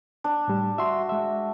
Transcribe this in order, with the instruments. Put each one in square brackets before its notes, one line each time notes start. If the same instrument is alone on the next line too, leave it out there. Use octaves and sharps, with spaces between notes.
[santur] D4
[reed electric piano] A2 G3
[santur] F#4 [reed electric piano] E5 C6
[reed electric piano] G#3 E5